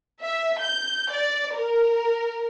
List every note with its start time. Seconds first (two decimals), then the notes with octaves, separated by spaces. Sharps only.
0.21 E5
0.60 G6
1.13 D5
1.55 A#4